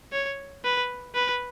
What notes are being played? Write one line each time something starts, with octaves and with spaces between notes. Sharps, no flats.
C#5
B4
B4